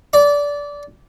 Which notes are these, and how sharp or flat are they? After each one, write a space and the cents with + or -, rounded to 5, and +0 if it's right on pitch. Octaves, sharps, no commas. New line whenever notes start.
D5 -20